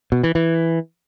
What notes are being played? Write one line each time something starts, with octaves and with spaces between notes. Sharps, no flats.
B2
E3
E3